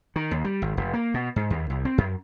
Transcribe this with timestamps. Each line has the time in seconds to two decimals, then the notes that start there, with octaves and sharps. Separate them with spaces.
0.16 D#3
0.31 D#2
0.45 G3
0.62 G#1
0.77 F1
0.94 A#3
1.14 B2
1.36 G#2
1.50 D#2
1.70 C2
1.85 C4
1.98 F#2